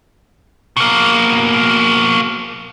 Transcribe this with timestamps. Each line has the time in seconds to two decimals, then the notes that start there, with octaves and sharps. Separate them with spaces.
0.77 B2 A#3